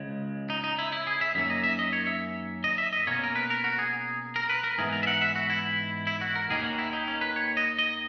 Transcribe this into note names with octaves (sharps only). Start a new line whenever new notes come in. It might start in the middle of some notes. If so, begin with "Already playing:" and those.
Already playing: C#2 C#3 G#3
D#4
D#4
E4
E4
G#4
E5
F#2 D#3 A#3 C#4 E5
D#5
E5
D#5
C#5
E5
D#5
E5
D#5
B2 A#3 C#4 C#5
A#4
B4
A#4
F#4
G#4
A#4
B4
A#4
G#2 E3 B3 G#4
A#4
E5
F#5
E5
F#4
E4
E4
F#4
A#4
D#2 D#3 A#3 C#4 G#4
F#4
E4
D#4
C#4
B4
C#5
D#5
D#5